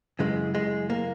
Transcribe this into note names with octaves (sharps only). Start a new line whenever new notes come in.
F#2 C#3 E3 G#3
G#3
A#3